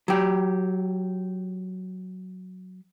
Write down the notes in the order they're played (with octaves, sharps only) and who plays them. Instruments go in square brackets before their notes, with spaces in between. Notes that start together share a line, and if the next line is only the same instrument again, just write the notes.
[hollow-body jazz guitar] F#3 G4